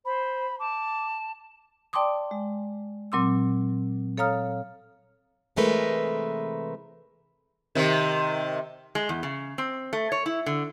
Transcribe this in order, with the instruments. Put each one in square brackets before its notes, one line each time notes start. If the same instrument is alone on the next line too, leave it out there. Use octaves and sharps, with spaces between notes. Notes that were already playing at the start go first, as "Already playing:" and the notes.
[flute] C5 [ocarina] B5
[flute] A5 [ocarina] D6
[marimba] D5 G5 A5 C6 D6 D#6
G#3
A#2 F#3 C4 C6 D6 E6
A4 C#5 F5 A#5 D#6 F6
[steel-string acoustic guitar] C3 E3 G#3 A3 A#4 B4
[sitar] C3 D#3
[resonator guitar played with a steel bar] G#3
E2
C#3
C4
A3
C#5
E4
D3